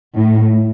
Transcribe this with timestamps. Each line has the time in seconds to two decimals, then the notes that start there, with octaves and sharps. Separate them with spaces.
0.16 A2